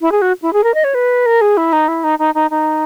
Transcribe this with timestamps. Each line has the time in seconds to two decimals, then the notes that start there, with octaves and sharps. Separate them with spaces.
0.01 E4
0.12 G#4
0.22 F#4
0.42 E4
0.53 G#4
0.64 A#4
0.74 D#5
0.84 C#5
0.94 B4
1.26 A#4
1.41 G#4
1.57 E4
1.73 D#4
1.88 E4
2.04 D#4
2.19 D#4
2.35 D#4
2.51 D#4